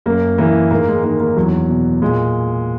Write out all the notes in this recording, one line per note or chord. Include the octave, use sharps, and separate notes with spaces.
F#2 A#3
E3 A#3
G#2 A#3
G#3
D#3 A#3
A#3
E2 F#3
B2
A#2 G#3